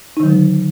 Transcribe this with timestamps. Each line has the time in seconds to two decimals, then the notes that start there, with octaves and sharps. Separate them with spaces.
0.17 D#4
0.20 D#3
0.23 F#3
0.26 D3
0.29 G#3